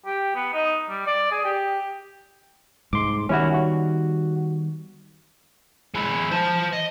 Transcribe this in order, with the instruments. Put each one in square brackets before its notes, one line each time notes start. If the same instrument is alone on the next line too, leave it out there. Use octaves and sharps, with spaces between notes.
[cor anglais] G4
B3
D#4
G3
D5
G#4
G4
[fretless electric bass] C2 G#2 [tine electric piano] C6 D6
[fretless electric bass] D#3 G3 B3 [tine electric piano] C#4 E4 F#4
[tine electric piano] F#4
[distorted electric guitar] G#3 E4
C5 A5
D#5